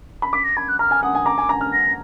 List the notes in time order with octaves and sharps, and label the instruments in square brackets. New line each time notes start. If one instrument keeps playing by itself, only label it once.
[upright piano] B5
[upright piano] D6 [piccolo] B6
[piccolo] A#6
[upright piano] B5 [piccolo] G#6
[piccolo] F#6
[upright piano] A#5 [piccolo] F6
[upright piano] G#5
[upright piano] F#5 [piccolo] D#6
[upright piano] G#5
[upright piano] A#5 [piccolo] D6
[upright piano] G#5
A#5
F6
[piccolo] A#6